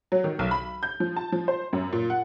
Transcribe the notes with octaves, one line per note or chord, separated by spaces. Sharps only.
F#3
D#3
B1
B5
G6
F3
A5
F3
C5
F#2
A#2
F#5